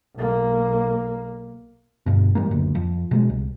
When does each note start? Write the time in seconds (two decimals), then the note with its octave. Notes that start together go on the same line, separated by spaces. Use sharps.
0.15 B1 A#3
2.06 G1 G2 B2
2.35 G#2 E3 G3 A#3
2.51 F#1 D2
2.75 F2
3.11 B2 G3 G#3
3.29 C2